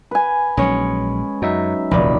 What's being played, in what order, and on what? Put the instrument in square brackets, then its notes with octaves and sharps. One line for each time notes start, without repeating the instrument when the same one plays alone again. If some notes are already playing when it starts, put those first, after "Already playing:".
[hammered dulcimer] B4 G#5
[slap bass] A#1 F#3 [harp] G#3 C#4 C#5 [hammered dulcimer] B4
[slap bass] F#2 [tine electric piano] F#3 D#4 E5
[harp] F1 [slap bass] A#1 D#2 [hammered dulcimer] D5 B5